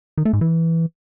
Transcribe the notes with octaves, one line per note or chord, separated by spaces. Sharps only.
D#3
A3
G#2
E3